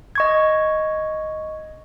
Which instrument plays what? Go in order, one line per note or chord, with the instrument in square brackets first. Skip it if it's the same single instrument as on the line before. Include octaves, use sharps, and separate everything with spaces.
[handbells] D#5 C#6 G#6